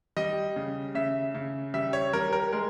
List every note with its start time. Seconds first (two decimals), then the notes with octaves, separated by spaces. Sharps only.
0.17 G3 D#5
0.56 C#3
0.95 C#3 E5
1.35 C#3
1.74 G3 E5
1.93 C#5
2.13 G3 A#4
2.33 A#4
2.53 G#3 A#4